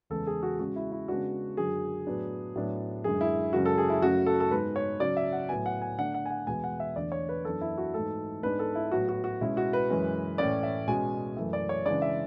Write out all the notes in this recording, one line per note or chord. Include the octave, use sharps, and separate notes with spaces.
E2 C#3 G#3 B3 A4
G#4
F#4
C#3 G#3 C#4 F#4
E4
E4
C#3 G#3 B3 D4 F#4
F#2 D3 F#3 G#4
A2 F#3 B3 D4
A2 F#3 B3 D4
F#2 D3 G#3 G#4
E4
F#2 C#3 G#3 C#4 F#4
A4
G#4
E4
F#2 C#3 F#3 A3 C#4 F#4
A4
A4
G#2 G#3 B3 B4
C#5
C#3 F#3 C#4 D5
E5
F#5
A2 F#3 B3 G#5
F#5
G#5
D3 A3 D4 F#5
F#5
G#5
F#5
E2 B2 G#3 B3 G#5
F#5
E5
E2 D3 A3 D5
C#5
B4
F#2 E3 B3 D4 A4
E4
F#4
G#2 E3 A3 A4
G#2 G#3 B3 D4 B4
A4
E4
A2 F#3 B3 F#4
F#4
F#4
B2 G#3 C#4 E4
F#4
B4
F#2 E3 G#3 C#4
A2 E3 A3 C#4 D5
E5
B2 G#3 C#4 G#5
F#2 E3 A3
D5
C#5
C#3 E3 G#3 D4 D5
E5